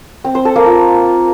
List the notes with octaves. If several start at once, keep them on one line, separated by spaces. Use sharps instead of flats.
C4
C5
A4
A#3
F4